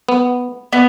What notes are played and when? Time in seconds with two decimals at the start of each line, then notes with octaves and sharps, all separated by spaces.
0.09 B3
0.72 B3